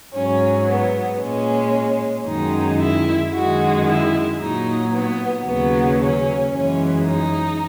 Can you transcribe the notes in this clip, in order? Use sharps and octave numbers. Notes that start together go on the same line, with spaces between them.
G#2 F#3 C#4
B3
A#2 G#3 C#4
F#2 D#3 G#3 D#4
E4
F#2 D#3 G#3 F#4
E4
A#2 F#3 D#4
B3
D#2 C#3 F#3 B3
C#4
F#2 E3 G#3 C#4
D#4